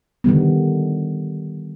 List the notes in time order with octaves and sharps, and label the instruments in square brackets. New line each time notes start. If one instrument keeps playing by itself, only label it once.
[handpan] D3 D#3 G3 B3